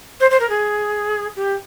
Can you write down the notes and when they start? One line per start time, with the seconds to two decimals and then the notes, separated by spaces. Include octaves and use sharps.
0.20 C5
0.31 C5
0.40 A#4
0.50 G#4
1.36 G4